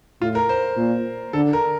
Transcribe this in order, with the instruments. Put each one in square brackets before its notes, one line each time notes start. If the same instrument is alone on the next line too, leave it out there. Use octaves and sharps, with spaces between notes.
[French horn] A2 [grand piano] F4
[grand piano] A#4
C5
[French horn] A#2
[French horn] D3 [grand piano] A4
[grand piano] A#4